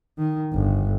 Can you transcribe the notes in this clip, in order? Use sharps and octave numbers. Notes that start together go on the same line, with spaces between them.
D#3
G1